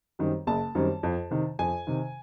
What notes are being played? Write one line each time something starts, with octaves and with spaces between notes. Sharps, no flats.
F#2 D#3 G3 C4
F#1 A5
F#2 D#3 G3 C4
F2
C3 D#3
F2 G#5
C3 D#3